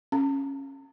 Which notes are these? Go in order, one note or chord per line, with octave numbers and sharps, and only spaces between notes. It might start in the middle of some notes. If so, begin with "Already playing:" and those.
C#4